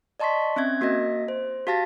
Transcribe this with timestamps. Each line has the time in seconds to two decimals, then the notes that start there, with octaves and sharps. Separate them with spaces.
0.20 D5 D#5 A5 C6 C#6 B6
0.56 C4 C#4 E5 G#6
0.81 A#3 F#4 A#4 D#5 A#6
1.28 C5
1.67 F#4 G4 F5 A5 A6 A#6